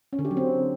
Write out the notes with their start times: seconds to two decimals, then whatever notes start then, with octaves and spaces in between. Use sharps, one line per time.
0.13 C#4
0.19 D3
0.25 G4
0.31 F#3
0.37 C4